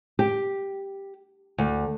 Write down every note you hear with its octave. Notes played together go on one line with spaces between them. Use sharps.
G4
D2